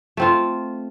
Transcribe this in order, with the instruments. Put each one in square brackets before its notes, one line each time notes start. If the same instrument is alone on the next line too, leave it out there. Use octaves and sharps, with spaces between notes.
[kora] A3 C4 F4